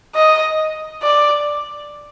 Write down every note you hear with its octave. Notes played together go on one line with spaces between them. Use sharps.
D#5
D5